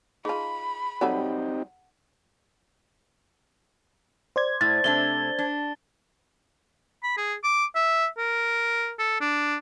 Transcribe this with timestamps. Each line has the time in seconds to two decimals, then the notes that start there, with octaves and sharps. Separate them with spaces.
0.25 D#4 F4 G#4 A5 B5
1.01 F#3 G3 C4 D#4 G4 A4 F#5 A5
4.36 C5 D5 G#6
4.61 A2 A6
4.84 C3 A3 D4 G7
5.39 D4
7.03 B5
7.17 G#4
7.44 D6
7.75 E5
8.18 A#4
8.99 A4
9.21 D4